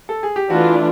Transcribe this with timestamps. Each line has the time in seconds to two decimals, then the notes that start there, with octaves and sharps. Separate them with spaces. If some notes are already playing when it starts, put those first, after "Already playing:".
0.09 A4
0.23 G#4
0.36 G4
0.50 E3 A3 D4 F4 F#4
0.67 E4